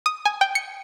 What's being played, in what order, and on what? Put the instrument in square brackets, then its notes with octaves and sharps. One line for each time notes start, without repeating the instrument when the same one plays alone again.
[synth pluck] D#6
G#5
G5
C#7